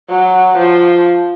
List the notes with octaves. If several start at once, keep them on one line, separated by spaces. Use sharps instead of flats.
F#3
F3